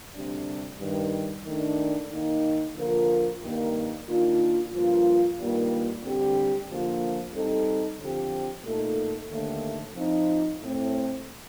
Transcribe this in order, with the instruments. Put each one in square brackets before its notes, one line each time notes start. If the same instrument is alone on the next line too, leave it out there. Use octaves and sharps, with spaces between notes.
[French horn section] D2 C3 G3 D4
G2 D#3 G3
D#3 A3 D4
D#2 D#3 A#3 D#4
D3 F3 A#3 F4 A#4
G2 D#3 G3 A#3
D#3 A#3 D4 F4
G2 F3 A#3 F4
G2 D#3 G3 A#3 F4
D2 D3 G3 C4 G4
D3 F3 A#3 F4
G3 C4 D#4 A4
D3 F3 C4 G4
A#2 A3 D#4 A4
D#2 D3 A3
F3 C4 D#4
A2 A3 C4